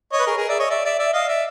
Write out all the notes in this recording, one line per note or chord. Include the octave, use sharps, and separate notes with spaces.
C#5 D#5
B4
G#4 A#4
G#4 A#4
D5 E5
C#5 D#5
D5 E5
D5 E5
D5 E5
D#5 F5
D5 E5